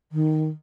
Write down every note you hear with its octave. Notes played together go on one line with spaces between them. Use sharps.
D#3